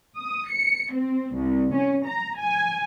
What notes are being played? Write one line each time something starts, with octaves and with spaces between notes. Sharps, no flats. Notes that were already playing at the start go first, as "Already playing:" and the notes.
D#6
C#7
C4
C2
C#4
A#5
G#5